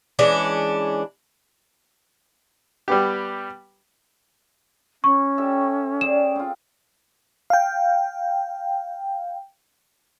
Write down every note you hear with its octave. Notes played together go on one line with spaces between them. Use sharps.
E3 G#3 C#4 D4
G3 B3 G4
C#4 C#6
G4 A4 E5
G#4 D5 G5 E7
C4 F4
F5 G5